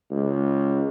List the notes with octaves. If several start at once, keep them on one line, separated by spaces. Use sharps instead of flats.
C#2